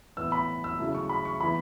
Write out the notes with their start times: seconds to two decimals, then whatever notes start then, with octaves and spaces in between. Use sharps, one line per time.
0.17 A2 E3 B3 E6
0.32 B5
0.64 E6
0.78 C#3 F#3 A3 E4
0.95 C#6
1.09 B5
1.25 C#6
1.41 E3 B3 E4 B5